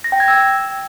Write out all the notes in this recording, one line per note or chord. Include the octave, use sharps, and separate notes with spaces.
A#6
G5
G#6
E6